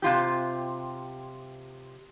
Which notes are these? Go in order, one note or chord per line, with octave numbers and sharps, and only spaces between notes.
C3 F4 G4